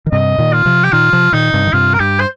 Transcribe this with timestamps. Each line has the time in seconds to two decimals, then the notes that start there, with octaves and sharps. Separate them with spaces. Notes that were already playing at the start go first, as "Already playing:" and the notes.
0.06 D#3
0.12 G2 C3 D#5
0.38 A#2 D#3
0.53 F4
0.66 C3 F3
0.84 G4
0.92 A#2 D#3 F4
1.13 C3 F3
1.32 A#2 D#3 D#4
1.53 G2 C3
1.67 D#3
1.73 G2 C3 F4
1.94 A#4
2.00 G2 G4
2.20 C5